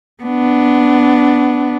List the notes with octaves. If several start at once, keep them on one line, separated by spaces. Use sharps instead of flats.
B3 D4